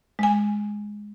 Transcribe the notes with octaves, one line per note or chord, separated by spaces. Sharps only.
G#3 G#5